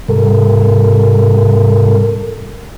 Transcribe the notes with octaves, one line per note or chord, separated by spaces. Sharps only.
G#2 C3 G3 A4 A#4